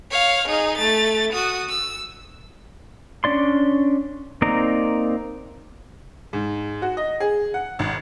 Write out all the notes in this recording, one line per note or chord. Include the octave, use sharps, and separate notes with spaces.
C#5 F5
D#4 G#4
A3 A6
F#4 D#6
E6
C#4 D4 D5 C6
A#3 C4 D#4 D5 A#5
G#2
F#4
D#5
G#4
F#5
G#1